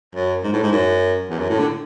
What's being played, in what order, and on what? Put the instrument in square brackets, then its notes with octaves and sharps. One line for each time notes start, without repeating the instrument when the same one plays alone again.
[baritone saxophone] F#2
G#2
A2
G#2
F#2
E2
F#2
A2
D3